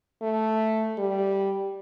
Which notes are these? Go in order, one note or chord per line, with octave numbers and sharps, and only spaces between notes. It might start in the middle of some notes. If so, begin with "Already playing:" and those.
A3
G3